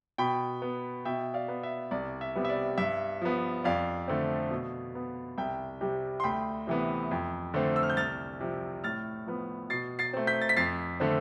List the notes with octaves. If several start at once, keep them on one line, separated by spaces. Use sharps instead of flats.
B2 G5 B5
B3
B2 E5 G5
D5 F5
B3
E5
C2 D5
E5
C3 G3 B3
E5
D5
G2 E5
F3 B3
F2 D5 F5
D3 A3 C4
B2
B3
C2 E5 G5
C3 G3
C6
D2 G5 B5
C3 E3 B3
F2
D3 A3 C4
E6
F6
G6
C2 F6 A6
C3 F3
A2 F6 A6
F3 B3
B2 A6 C7
A6 C7
A3 C4
G6 B6
A6
B6
F2 A6 C7
D3 A3 C4